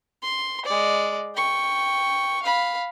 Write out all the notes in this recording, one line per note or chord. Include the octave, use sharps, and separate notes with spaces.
C6
G#3 D5
G5 C#6
F5 B5